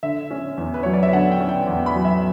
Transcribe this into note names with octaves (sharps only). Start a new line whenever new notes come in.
D3 E5
C#4
E2
B4
F#3 C#5
D5
E5
D3 F#5
G5
C#4
G5
E2
B5
F#3
E5